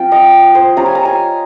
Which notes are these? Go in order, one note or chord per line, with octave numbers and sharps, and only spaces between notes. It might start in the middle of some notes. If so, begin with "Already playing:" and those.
Already playing: F3 C4 F4 G5
D#5
C5
G3 C#4 F4 A#5
G#5
A#5
G#5